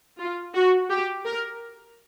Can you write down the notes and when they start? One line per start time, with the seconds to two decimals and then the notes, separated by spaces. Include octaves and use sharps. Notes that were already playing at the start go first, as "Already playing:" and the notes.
0.18 F4
0.54 F#4
0.90 G4
1.25 A#4